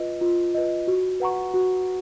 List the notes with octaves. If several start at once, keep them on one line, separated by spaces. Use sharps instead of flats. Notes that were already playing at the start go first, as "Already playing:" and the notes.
Already playing: F4 B4 D#5
F4
B4 D#5
F#4
B4 F#5 A#5 C#6
F#4